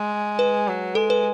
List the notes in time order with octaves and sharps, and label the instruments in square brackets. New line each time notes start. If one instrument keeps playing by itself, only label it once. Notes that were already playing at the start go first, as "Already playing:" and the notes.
Already playing: [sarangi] G#3
[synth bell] B4
[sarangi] F#3
[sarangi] G#3 [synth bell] A4
[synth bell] B4